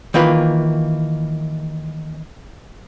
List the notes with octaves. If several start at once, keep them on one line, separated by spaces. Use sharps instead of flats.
D#3 E3 A#3 F4 B4